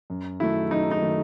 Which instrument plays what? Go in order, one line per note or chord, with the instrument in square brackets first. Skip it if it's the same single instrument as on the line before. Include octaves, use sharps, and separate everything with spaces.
[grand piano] F#2
[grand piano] D#3 F#3 A3 [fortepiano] E4
[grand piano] F#2 [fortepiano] D#4
[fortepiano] D#4
[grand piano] D#3 F#3 A3